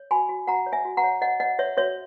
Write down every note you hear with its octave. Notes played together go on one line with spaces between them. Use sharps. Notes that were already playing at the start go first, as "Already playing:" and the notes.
Already playing: C#5
F#4 G#5 B5
F#4
F#4 F#5 A#5
C#5
E5 G#5
F#4
F#5 A#5
C#5
C#5 D#5 F#5
C#5 D#5 F#5
C#5 E5
F#4 C#5 E5